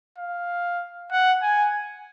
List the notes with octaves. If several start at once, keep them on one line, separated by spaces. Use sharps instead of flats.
F5
F#5
G#5